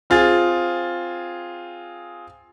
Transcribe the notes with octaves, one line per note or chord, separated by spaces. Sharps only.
C4 F4 G#4 A6